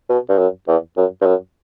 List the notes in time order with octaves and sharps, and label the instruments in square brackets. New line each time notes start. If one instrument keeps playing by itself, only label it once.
[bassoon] B2
G2
F#2
E2
F#2
G2
F#2